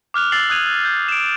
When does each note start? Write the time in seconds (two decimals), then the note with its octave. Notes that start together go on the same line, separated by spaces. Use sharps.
0.14 D6 F6 F#6 F7
0.32 E6 A6 C7 F#7
0.50 D#6 F#6 G#6 D#7 F7
0.85 G6
1.09 D7 E7